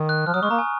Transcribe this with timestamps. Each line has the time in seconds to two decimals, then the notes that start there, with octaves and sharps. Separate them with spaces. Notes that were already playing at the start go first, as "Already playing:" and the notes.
Already playing: D#3
0.09 F#6
0.26 F3 F6
0.34 F#3 D#6
0.43 G#3 C#6
0.50 A#3 A#5
0.59 G#5